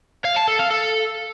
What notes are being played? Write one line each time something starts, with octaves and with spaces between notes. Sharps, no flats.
F5
A5
A4
F5
A4